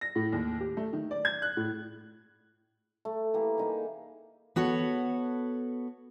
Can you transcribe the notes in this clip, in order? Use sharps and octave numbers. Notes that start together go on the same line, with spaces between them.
A#6
A2
D#2
G4
A3
D#3
D5
G#6
F#6
A2
A3
E3 A#3 G4
A#3 D#4 G#4
B3 F#4 A4 C#5